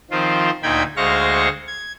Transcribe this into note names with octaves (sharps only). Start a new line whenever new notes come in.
D#3 F3 C4 F4 C5
D2 A#2 D#4 G5 B5 G#6
D2 G#3 C5 F5 C#6 A#6
G#6